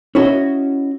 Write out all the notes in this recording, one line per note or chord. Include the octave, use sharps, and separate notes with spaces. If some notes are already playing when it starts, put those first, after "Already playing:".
C#4 E4 F#4 D#5